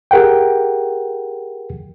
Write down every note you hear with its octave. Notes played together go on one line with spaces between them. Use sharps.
G4 G#4 A#4 F#5 G5